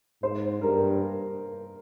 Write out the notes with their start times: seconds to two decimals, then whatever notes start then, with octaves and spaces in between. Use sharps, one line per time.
0.22 G#2 C5
0.61 G2 A#4